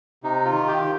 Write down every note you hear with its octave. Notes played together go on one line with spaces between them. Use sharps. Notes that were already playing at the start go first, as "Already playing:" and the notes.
C3 D#4
F4
D#3
G4